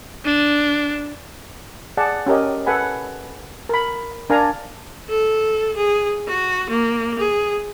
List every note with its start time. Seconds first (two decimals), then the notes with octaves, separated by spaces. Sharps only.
0.24 D4
1.97 G#4 D5 F#5 A5
2.26 C#4 G4 A#4 D#5
2.66 A4 B4 F#5 G#5 B5
3.69 A#4 B5
4.30 D4 A#4 F5 G#5 A#5
5.09 A4
5.77 G#4
6.28 F#4
6.70 A#3
7.19 G#4